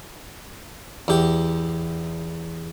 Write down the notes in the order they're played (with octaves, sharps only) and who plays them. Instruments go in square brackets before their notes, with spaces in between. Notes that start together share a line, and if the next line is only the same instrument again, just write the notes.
[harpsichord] E2 G4